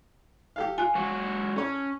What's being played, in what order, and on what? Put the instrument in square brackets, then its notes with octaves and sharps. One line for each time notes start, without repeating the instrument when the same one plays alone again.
[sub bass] D1 [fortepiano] G4 A4 F5
[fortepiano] F4 [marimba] G#5 F#6
[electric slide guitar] G#3 F#4 C#5
[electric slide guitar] C#4 [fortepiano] A4 C#5